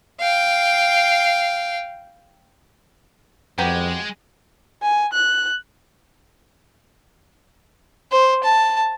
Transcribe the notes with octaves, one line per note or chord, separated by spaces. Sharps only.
F5 G5
F2 F#3 G#3 B3 G4
G#5
F#6
C5
A5